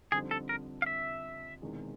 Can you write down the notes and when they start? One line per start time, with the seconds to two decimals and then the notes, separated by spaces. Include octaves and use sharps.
0.12 F2 D3 G3 C4 D#4 G#4
0.31 A4
0.49 A#4
0.82 F5
0.86 E5
1.62 E1 E2 C3 D#3 G#3